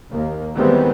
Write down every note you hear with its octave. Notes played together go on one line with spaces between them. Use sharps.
D#2 A#3
D#3 E3 G3 G#3 B3 C4